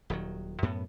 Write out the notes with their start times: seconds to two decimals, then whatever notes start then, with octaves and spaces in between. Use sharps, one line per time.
0.10 D#1 D#3 F#3
0.62 F#2 A2 B3